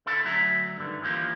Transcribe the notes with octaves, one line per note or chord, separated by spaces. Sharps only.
D3 E4 A4
D2 F#3 G#4 E5 A#5
G2 D3 D#3
E3 F3 A#3 G4